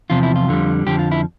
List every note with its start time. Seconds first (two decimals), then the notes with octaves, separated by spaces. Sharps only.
0.10 E2 C3 F3 F4
0.23 E4
0.36 F4
0.48 F2 D3 G3
0.87 F2 D3 F3 G4
0.99 F4
1.12 E4